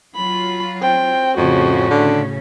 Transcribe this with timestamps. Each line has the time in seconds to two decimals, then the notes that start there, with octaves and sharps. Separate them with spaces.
0.16 F#3 F4 B5
0.82 C4 G5
1.37 F2 A2 C#3 C#4 F#4
1.90 D3